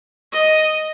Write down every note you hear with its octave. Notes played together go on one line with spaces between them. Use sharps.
D#5